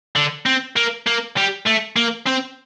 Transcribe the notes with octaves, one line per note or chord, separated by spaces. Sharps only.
D3
C4
A#3
A#3
G3
A3
A#3
C4